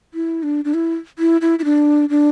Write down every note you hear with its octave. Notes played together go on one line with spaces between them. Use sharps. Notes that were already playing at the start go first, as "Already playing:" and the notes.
E4
D4
D4
E4
E4
E4
E4
D4
D4